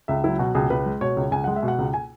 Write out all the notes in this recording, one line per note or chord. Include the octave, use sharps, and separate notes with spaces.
C#2 E5
F#3 E4
B2 F#4
C#2 G#4
C#2 B4
G#3
B2 C#5
C#2
C#2 G#5
G#3 F#5
E5
B2
F#5
C#2
G#5